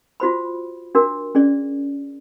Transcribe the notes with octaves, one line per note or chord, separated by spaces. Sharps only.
F4 F#4 C5 B5
D4 F#4 A#4
C#4 G#4 D5